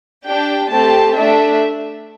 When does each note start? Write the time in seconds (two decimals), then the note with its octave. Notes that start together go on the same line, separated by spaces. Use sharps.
0.24 D4 G4 G5
0.70 A3 C4 G4 A5
1.16 A3 D4 E5